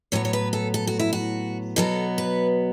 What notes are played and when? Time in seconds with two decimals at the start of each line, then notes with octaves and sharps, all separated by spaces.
0.12 A2 F#3 B3 C#5
0.25 C#5
0.33 B4
0.53 A4
0.74 A4
0.87 F#4
1.00 E4
1.13 F#4
1.76 B2 F#3 B3 A4
2.18 B4